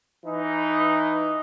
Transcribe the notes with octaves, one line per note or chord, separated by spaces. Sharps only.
E3 D#4